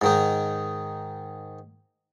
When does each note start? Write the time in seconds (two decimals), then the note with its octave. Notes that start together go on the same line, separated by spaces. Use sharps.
0.02 G#2 D#3 D#4